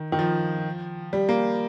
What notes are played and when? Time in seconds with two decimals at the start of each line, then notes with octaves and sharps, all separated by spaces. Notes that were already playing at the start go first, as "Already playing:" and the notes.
Already playing: D#3
0.12 D#3
0.19 F3
1.13 G3
1.29 A#3